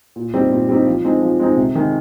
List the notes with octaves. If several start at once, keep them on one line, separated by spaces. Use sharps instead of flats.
A#2
G3 C4 D#4
A#2
G3 C4 D#4
F3
G#3 C4 D#4
F3
G#3 C4 D#4
C3
D#3 G#3